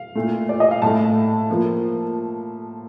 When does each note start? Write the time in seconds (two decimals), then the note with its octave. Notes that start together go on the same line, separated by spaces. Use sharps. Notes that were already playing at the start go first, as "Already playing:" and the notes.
Already playing: F5
0.15 A#2 A3
0.49 D5
0.60 D#5
0.71 F5
0.82 A2 A3 A5
1.50 F3 A#3